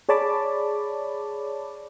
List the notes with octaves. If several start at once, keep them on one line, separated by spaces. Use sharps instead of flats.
G#4 C#5 D5 A5 B5 D6